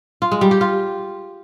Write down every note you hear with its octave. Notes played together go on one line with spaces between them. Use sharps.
F4
G#3
G3
G4
F4